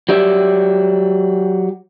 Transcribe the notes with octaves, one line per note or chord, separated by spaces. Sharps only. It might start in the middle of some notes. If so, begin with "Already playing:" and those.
F#3 G4 D5 E5